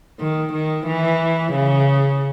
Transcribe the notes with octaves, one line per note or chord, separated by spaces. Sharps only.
D#3
D#3
E3
C#3